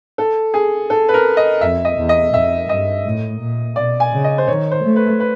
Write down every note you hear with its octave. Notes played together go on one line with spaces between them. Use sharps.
A4
G#4
A4
B4
A#4
D#5
F2 E5
D#5
E2
D#5
F2 E5
G2 D#5
A2
A#2
B2 D5
G#5
C#3
D#5
C5
D#3 C#5
C5
A3
B4
B4